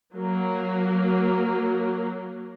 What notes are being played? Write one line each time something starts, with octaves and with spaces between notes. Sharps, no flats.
F#3 A#3